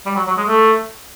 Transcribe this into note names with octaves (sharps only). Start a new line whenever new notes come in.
G3
F#3
F#3
G#3
A3